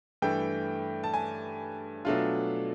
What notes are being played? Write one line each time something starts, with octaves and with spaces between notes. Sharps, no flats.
G2 E3 A3 G5
A5
G#5
B2 F#3 A3 D4 F4